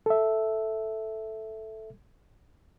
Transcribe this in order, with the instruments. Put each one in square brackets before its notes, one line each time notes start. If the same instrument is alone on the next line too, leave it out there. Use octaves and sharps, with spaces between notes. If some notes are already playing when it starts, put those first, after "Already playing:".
[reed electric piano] A4 E5